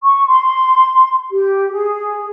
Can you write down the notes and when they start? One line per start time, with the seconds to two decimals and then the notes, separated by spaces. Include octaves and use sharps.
0.03 C#6
0.27 C6
1.31 G4
1.71 G#4